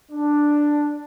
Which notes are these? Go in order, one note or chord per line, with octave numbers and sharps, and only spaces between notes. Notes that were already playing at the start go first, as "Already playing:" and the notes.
D4